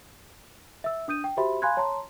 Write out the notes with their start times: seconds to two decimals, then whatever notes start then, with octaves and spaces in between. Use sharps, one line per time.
0.84 E5 E6
1.08 D4 D#6 G6 D#7
1.24 G5
1.37 F#4 G4 C5 E5 B5 C6
1.62 F5 G#5 B5 C6 F#6 G#6
1.77 C#5 A5 A#5 C6